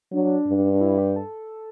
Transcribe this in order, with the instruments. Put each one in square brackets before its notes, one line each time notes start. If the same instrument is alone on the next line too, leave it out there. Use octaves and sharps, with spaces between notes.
[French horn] F#3 [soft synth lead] D4
[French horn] G2
[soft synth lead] D4
E4
G4
A4